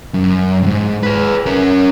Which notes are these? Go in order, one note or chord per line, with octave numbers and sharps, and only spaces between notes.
F#2
F2 G#2
G#4 B4
C#4 A#4